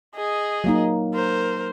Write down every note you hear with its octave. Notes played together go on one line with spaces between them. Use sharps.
G#4 D#5
F#3 A#3 D#4
A#4 C5